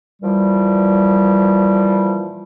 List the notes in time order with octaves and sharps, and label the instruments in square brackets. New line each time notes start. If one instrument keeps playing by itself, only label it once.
[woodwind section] A#2 E3 F3 G3